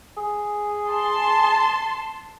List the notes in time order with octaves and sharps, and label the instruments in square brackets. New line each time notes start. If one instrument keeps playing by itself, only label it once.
[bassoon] G#4
[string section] A5 C6